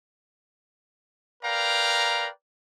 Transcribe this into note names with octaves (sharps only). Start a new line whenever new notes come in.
A#4 B4 D5 F5 G5 A#5